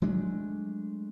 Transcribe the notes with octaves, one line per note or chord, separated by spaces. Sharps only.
F#3 G#3 A3 D4